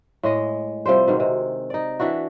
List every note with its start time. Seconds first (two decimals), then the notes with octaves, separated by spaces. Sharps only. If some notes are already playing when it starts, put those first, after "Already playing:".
0.23 A2 G#3 D#5
0.86 C3 F3 G3 C5
1.08 B2 D#3 G#3
1.20 C3
1.70 D#4 D5
2.00 E3 D4 E4 F#4